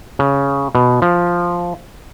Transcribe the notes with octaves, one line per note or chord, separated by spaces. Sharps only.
C#3
B2
F3